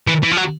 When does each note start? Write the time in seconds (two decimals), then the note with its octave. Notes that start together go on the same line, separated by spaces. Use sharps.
0.08 E3
0.23 E3
0.32 F3
0.37 F#3